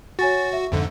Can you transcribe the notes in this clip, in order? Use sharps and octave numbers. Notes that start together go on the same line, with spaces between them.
F#4 C#5 G#5 A6
E5
F2 G#2 D3